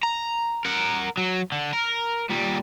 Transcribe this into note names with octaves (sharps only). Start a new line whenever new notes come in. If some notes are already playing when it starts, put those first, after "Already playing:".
A#5
A#4 F#5
F#3
D3
A#4
A#2 G3